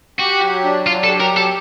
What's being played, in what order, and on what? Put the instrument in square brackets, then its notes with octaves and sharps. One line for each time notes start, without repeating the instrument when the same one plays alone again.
[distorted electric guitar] F#4 [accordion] G4
[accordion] F#3
D4
[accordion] F#3 [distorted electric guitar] F4
[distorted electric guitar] A4
[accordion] G4
[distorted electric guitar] A#4
[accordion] F#3 [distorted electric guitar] A4